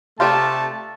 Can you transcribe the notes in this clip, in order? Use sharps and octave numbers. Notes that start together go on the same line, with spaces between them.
C3 A3 F4 G4 D5 A5